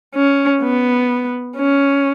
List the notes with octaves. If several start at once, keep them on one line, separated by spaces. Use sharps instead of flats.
C#4
B3
C#4